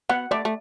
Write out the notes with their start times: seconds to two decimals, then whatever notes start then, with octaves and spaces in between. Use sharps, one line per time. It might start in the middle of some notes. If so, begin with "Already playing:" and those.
0.09 B3 F#5
0.31 A3 D5
0.45 A3